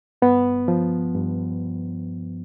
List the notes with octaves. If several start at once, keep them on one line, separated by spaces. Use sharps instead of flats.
G2 B3
F3
G2